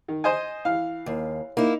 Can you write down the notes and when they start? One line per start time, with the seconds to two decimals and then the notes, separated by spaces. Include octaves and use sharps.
0.08 D#3
0.24 C5 D#5 G#5
0.65 E3 F5
1.06 D#2
1.57 A#3 D#4 E4